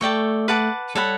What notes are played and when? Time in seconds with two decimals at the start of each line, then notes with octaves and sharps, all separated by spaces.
0.01 A3 A4 D5 G5 C#6
0.48 B4 F#5 A5 D6
0.95 G3 A4 C#5 F#5 B5